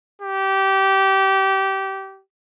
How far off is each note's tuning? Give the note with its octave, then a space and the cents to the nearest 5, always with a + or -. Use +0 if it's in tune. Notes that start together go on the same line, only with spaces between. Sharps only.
G4 -20